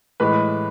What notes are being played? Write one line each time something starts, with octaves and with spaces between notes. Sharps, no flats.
A2 E3 G#3 B4